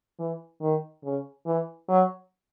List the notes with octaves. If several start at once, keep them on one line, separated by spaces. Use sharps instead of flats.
E3
D#3
C#3
E3
F#3